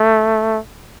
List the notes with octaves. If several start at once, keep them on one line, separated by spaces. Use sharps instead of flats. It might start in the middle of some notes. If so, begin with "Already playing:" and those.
Already playing: A3